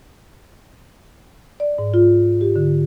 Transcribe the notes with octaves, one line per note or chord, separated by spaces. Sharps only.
D5
G#2
F4
G4
D3